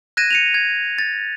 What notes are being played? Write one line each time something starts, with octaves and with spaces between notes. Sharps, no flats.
F#6 G#6 A#6 D#7 E7
C#7 D#7 F7
G#6
A6